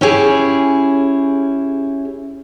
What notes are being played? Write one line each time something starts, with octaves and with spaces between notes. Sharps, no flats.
C#4 E4 G4 G#4